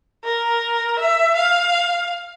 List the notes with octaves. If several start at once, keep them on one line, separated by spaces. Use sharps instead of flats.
A#4
E5
F5